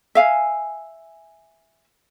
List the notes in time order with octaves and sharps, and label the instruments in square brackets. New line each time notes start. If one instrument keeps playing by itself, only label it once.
[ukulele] E5 F5 G#5